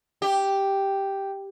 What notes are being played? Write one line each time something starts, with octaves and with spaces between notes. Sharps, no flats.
G4